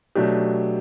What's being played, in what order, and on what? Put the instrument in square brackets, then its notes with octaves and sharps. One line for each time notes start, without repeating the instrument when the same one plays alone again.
[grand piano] B2 F#3 A3 D4 G4